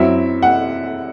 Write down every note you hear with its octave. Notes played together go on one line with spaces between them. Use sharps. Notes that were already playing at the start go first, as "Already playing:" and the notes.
Already playing: F#2 F#3 C4 E4 E5
F#5